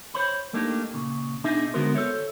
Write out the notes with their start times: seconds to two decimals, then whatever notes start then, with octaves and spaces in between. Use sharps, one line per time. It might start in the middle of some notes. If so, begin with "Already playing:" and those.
0.14 C5 C#5 B5
0.53 A3 A#3 D4 D#4 G4
0.94 A#2 C#3
1.44 B2 D4 D#4 G#4 E5
1.74 D3 G#3 B3 F#4 A#4 C5
1.94 A4 C5 C#5 E5